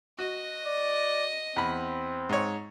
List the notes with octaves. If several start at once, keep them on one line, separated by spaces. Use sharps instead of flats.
F#4 D#5
D5
E2 C4 B5
G#2 C#5